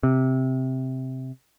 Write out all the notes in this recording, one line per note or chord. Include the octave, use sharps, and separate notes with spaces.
C3